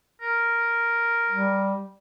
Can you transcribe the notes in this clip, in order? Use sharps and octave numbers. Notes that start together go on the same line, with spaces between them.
A#4
G3